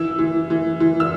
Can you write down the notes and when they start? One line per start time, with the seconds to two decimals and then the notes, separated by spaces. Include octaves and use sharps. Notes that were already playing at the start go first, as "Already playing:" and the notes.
Already playing: E3 E6
0.19 E3
0.50 E3
0.80 E3
1.00 E6